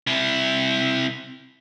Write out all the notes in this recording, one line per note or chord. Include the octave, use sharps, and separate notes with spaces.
C3 E4